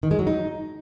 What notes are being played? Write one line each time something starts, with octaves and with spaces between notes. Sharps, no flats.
D#3
G#3
F#3
D#4